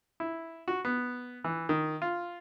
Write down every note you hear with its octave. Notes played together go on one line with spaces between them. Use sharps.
E4
F#4
B3
E3
D#3
F4